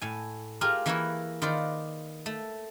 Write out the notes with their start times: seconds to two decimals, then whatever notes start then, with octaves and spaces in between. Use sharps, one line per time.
0.02 A2 G#5
0.61 F4 G4 G#4 A#4 F5
0.86 E3 A#3 E4 A#4 B4 C#5
1.42 D#3 F4 B4 C5 D5
2.26 A3